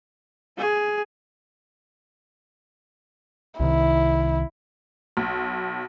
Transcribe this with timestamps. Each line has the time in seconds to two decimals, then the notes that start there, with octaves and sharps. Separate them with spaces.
0.58 G#4
3.60 C2 C3 D#3 E4
5.17 B1